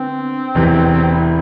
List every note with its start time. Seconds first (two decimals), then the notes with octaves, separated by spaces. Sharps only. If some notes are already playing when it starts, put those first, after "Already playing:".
Already playing: D3 B3 C4
0.55 E1 E2 C3 E3
1.13 E4